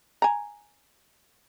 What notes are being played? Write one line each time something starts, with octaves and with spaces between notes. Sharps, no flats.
G#5 A#5